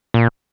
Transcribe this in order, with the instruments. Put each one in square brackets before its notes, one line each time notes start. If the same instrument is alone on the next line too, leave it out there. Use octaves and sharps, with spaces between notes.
[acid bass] A#2